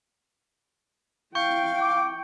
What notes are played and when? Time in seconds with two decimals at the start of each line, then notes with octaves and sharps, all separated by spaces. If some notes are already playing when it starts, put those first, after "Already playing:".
1.35 E4 F5 G5 C#6 G6 C#7
1.81 D6